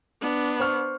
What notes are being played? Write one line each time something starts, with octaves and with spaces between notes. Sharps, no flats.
B3 D4
C5 C#6 F6